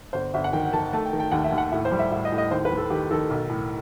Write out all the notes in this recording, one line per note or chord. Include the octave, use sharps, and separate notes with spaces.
G1 C5
G1 E5
F#5
D#3 G5
D#3 A5
A3 A5
G5
D#3
G5
D#2 F#5
E5
D#2
F#5
A2 E5
C5
G3
E5
A2 E5
D#5
A2
D#5
D#2 C5
B4
D#2
A4
D#3 G4
D#3 A4
B1
A2